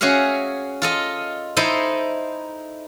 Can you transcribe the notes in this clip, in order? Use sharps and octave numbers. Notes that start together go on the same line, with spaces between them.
C#4 F#4 G#4 E5 F5
F4 A4 D#5
D#4 E4 A4 C5 D#5